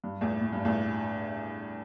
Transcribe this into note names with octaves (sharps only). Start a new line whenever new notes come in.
G2
E2 A2
A2
G2
E2 A2